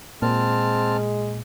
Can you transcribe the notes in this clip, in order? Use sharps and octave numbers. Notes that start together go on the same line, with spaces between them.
A#2 G#3 C4 A5 F6